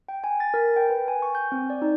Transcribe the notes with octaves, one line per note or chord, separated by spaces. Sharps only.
G5
G#5
A6
A#4
G5
B4
G#5
C#6
G6
C4
D5
D#4